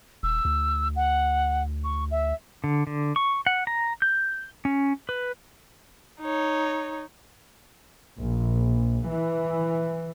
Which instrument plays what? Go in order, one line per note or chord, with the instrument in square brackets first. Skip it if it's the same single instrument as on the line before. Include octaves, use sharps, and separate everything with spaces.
[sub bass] D#1 [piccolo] E6
[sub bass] D2
[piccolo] F#5
C#6
E5
[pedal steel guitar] D3
D3
C#6
F#5
A#5
G6
C#4
B4
[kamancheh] D#4 C#5
[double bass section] A#1
E3